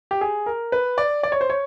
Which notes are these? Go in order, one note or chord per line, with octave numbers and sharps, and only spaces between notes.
G4
G#4
A#4
B4
D5
D5
C#5
C5
C#5